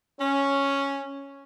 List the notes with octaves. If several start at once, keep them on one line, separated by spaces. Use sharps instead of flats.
C#4